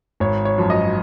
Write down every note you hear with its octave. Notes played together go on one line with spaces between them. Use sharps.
G#1 C#5
C#5
F#2 F3
D#5